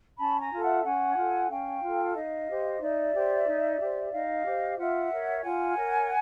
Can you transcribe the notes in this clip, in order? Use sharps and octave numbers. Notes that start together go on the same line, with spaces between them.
C#4 A5 B5
G#5 A#5
F4 A4
E5 F#5
C#4 F#5 G#5
F4 A4
C#4 F5 G5
F4 A4
D#4 D#5 F5
G4 C5
D#4 D5 E5
G4 C5
D#4
G4 C5
D#4 D#5 F5
G4 C5
F4 E5 F#5
A#4 C#5
F4 F#5 G#5
A#4 C#5